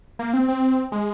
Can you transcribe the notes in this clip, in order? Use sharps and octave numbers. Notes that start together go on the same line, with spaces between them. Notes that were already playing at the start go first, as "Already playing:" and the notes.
A#3
C4
C4
G#3